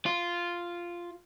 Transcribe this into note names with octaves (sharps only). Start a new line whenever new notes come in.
F4